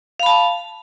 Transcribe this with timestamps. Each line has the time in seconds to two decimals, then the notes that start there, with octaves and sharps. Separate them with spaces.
0.20 F5
0.23 B5
0.26 A5